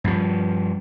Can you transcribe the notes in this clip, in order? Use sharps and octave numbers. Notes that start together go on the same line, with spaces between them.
G2 F3